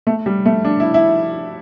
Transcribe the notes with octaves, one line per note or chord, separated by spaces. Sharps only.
A3
G3
A3
D4
E4
E4